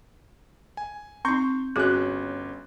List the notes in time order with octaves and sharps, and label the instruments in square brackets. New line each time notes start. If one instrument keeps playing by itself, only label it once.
[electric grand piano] G#5
[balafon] C4 D#4 [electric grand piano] C6 C#6 G6
[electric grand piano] G1 C#4 F#6 [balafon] F#4 G#4